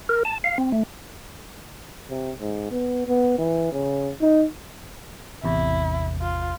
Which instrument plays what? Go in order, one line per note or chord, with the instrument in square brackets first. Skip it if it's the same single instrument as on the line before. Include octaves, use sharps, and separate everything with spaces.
[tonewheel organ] A#4
A5
F5
C4
A3
[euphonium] C3
G#2
B3
B3
E3
C#3
D#4
[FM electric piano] A1 E2 C3 [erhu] E4
[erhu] F4